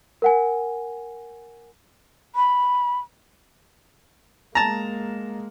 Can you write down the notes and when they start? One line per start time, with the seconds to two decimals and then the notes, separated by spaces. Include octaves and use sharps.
0.22 A#4 F#5 G#5
2.35 B5
4.55 G#3 A#3 A5 A#5